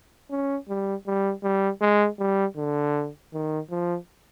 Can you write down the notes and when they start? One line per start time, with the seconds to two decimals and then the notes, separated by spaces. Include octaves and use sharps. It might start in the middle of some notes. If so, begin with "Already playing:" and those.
0.31 C#4
0.69 G3
1.07 G3
1.43 G3
1.81 G#3
2.19 G3
2.57 D3
3.33 D#3
3.71 F3